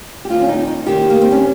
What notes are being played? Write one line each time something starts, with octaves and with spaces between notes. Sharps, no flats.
G4
D#2 D#3 F4
C#4
D#4
D#4
D#2 D#3 G4
A#3
C4
C#4